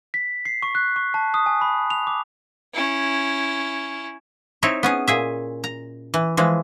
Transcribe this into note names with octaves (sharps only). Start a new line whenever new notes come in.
B6
C7
C#6
F#6
C#6
A5
D#6
G#5
B5
F7
D6
C#4 E4
C4 D#4 E4 C#5
B3 C#4 G#4
A#2 G#4 E5
A#5
E3
E3 F3 G#3